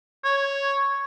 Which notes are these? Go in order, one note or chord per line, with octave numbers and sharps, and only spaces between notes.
C#5